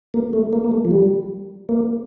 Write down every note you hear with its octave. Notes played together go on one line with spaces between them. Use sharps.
A#3
A3
A#3
A#3
A3
F3
G3
A#3